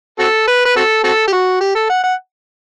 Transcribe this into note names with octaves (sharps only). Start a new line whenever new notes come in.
C4 F#4 A4
B4
B4
C4 F#4 A4
C4 F#4 A4
G4
F#4
G4
A4
F#5
F#5